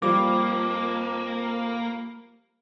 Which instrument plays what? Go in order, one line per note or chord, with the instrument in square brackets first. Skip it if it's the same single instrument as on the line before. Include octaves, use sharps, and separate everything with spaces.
[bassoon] F2 [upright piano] F3 G3 [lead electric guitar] A#3 [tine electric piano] D6